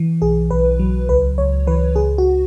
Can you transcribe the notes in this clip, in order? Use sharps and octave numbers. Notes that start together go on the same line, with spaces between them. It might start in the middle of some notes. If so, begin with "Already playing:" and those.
Already playing: E3
B1 G#4
B1 B4
F#3
C#2 B4
C#2 C#5
E3 B4
C#2 G#4
F#4